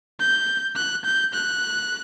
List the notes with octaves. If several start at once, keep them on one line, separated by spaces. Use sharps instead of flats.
G6
F#6
G6
F#6